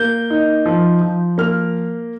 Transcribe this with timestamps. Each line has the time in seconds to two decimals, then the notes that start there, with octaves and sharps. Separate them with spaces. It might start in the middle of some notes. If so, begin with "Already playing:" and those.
Already playing: A#3 G6
0.30 D#4
0.66 F3
1.02 F3
1.38 A#3 F6